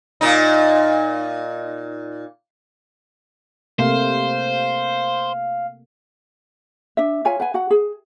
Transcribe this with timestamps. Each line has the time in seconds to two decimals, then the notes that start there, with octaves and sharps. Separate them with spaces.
0.21 A#2 D#4
3.79 C3 A3 A#3 C5 F5
6.97 D4 E5
7.25 F4 C#5 E5 G#5
7.40 B4 F#5 G#5
7.54 F#4 F#5
7.70 G#4